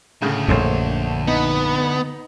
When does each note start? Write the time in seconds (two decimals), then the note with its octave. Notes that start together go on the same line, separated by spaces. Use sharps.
0.22 D2 A2 C#3
0.48 A#1 F#2 A3 C5 C#5
1.27 B3 D#4